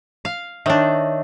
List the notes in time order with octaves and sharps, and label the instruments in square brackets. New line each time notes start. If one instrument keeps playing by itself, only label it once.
[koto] F5
[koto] D#3 D4 [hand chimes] C#5 E5